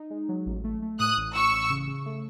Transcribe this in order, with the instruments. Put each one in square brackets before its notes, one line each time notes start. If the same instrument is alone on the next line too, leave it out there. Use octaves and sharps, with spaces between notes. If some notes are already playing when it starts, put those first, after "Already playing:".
Already playing: [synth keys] D#4
G#3
F#3
A1
A3
A3
[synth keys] A2 [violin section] D#6 F#6
[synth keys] A1
[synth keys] A2 [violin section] C#6 E6
[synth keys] A1
C#3
C#3
A3